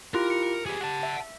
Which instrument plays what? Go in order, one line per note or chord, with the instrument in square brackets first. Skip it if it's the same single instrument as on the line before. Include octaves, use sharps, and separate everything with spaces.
[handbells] E4 F4 G4 [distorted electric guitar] A#4
[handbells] C#7
[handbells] G4 [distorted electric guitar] G#4 B4
[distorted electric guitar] F#5 A5
[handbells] E5